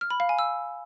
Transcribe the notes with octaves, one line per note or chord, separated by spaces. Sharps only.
F6
B5
F5
G#5
E6